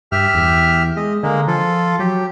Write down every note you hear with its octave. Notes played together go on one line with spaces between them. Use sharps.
G2 G4 E5 F6
E2
G#3 D#5
D3 G#3 A#3
F3 F4 A4
F#3 G4